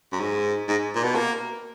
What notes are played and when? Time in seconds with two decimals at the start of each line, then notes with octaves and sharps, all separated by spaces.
0.12 F#2
0.20 G#2
0.68 G#2
0.95 A#2
1.04 B2
1.15 A#3